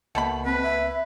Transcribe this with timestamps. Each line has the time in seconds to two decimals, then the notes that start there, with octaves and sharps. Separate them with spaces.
0.15 C#2 B2 A3 A#3 B5
0.45 C4 B4
0.62 E5